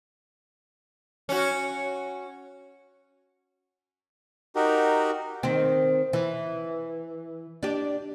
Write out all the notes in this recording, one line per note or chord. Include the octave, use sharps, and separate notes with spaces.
C#4 F#4
D#4 F#4 G4 A#4
D#3 C4
E3
D4 G4